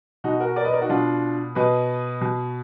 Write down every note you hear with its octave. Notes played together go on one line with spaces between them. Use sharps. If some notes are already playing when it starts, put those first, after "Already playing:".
B2 D#4 F#4
F#4 A#4
A#4 D5
B4 D#5
A#4 D5
D#4 F#4
B2 D4 F4
B2 B4 D#5
B2